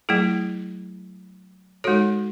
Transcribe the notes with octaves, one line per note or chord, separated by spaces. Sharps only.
F#3 A3 E4 G#4
G#3 D#4 F#4 A4 C#5